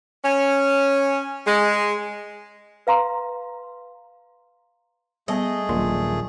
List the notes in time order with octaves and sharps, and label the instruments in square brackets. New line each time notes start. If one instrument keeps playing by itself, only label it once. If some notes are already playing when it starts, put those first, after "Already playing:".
[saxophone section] C#4
G#3
[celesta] B4 F5 A#5 C6
[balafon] G3 B3 [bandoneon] A3 G#4 [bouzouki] D#5
[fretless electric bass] D#1 A#1 A#2 [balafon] F#3 C6